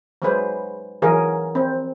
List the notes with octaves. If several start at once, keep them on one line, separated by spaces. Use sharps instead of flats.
F#3 G#3 B4 C5
E3 F#3 G#4 A#4
C4